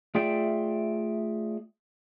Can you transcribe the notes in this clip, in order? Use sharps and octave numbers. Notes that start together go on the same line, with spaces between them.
A3 F4 G#4 D5 E5 G5